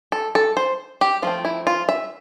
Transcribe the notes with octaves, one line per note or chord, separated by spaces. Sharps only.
A4
A4
C5
G4
F3 A3 C4 F4
E4
F4
E5